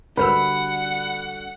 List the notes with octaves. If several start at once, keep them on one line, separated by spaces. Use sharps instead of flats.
D3 G3 F#4 A#4 B4 F#5 B5 E6